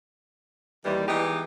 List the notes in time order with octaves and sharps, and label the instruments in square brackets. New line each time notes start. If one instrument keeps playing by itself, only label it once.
[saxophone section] D#2 D#3 E3 G3
E3 G#3 B3 D#4 G4